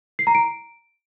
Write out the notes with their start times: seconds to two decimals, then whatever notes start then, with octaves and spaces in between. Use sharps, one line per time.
0.19 C7
0.27 A#5
0.35 D7